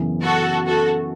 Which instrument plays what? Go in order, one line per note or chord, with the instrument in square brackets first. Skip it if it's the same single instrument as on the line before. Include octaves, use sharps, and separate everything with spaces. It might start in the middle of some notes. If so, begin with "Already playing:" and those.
Already playing: [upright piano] F#2 C#3 E3 B3
[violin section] F#4 A4
F#4 A4